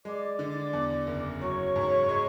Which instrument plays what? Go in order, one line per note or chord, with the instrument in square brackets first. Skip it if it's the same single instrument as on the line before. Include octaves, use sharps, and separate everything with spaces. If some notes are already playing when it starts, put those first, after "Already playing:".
[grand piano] G#3 [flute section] D5 D6
[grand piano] D3
E2
F#1
[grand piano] F#3 [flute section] C#5 C#6
[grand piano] G#2
G#3